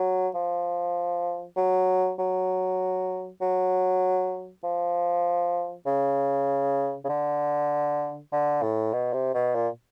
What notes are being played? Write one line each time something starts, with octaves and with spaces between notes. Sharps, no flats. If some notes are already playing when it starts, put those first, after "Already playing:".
Already playing: F#3
F3
F#3
F#3
F#3
F3
C#3
C#3
D3
D3
A2
B2
C3
B2
A#2